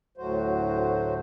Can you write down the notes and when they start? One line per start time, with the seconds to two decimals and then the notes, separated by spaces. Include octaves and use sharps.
0.18 D2 A2 F#3 A3 F#4 C5